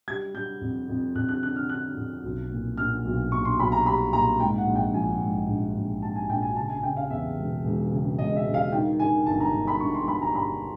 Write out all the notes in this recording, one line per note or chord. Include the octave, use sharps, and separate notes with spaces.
G3 G#6
G3 G6
F2
F2
F2 F#6
F#6
D3 F#6
F6
D3 F#6
F2
B1
A#2
A#2 F6
B1
A#2 C#6
C6
B1 B5
A#5
G3 B5
A#2 A#5
G#2 G5
F#5
A#1
G5
F3 G#5
G#2
A#1
A#1
G#2 A5
G#5
A#1 G5
G#5
C#3 A5
G#5
C#3 G5
F5
E2 E5
E1
E1
C#3
E1 D#5
E5
E1
F5
D#3 G5
D#3 G#5
G1 A5
A#5
G1
B5
G2 C#6
C6
G1 B5
A#5
G2 B5